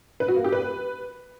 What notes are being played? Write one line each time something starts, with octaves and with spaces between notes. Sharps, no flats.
B4
F#4
A#3
G4
B4